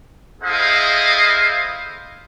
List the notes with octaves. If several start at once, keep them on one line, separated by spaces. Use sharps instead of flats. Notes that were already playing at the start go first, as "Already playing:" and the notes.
E4 G#4 A4 C5 D#5 F5